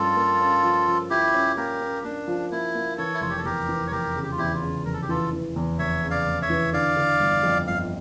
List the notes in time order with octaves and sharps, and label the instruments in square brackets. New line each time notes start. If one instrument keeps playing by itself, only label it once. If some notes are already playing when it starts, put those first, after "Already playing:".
Already playing: [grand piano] G2 F3 A#3 C#4 [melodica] F4 A4
[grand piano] A#3
C#4
F3
F3
[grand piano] F3 [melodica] E4 G4
[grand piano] C#4
[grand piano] A#3 [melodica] G4 A#4
[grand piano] C#4
[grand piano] A#3 [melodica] D4
[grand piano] F3
[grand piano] A#3 [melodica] E4
[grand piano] A#3
[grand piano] E3 [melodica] A4 C#5
[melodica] E4
[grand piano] F1 [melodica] F4
[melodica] G4
A4
[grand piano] E2 [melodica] G4 A#4
[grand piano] E3
[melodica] C#5
[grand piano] F1 [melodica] G4 A#4
[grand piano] C#3
[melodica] G4
F4
[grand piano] E2 [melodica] E4 G4
[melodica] F4
[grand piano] C#3
[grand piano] F1 [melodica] A#4
[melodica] A4
G4
[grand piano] E3 [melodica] F4 A4
[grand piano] E3
E2
[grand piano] F1 [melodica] C#5 E5
[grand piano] C#3
[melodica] D5 F5
[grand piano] F1
[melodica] C#5 E5
[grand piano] E3
[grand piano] D3 [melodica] D5 F5
[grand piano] D3
G1
F2
[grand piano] G1 [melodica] F5